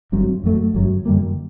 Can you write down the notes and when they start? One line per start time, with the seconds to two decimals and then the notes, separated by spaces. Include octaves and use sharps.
0.12 G1 G2 F#3 C4
0.44 F#2 F#3 A3
0.74 G1 F#2 F#3
1.05 F#2 D3 G3 A#3